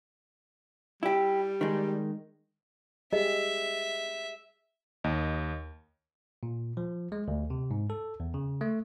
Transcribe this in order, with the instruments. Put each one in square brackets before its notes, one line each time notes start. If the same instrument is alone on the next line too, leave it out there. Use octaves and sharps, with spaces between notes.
[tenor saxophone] G3 [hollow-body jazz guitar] E4 G4
[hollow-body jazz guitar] D#3 G#3
[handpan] G4 G#4 [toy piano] D#5 [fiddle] E5
[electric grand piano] D#2 D#5
[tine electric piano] A#2
F3
G#3
D2
C3
G#2
A4
E2
C#3
A3